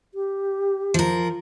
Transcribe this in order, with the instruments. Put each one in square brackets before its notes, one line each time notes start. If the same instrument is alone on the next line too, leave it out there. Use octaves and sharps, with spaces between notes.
[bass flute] G4
[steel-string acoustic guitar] F3 A#4